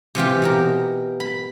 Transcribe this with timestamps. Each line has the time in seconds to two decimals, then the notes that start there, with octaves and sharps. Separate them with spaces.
0.15 C3 E3 F4 G4
0.42 B2 G4 A#4
1.20 B5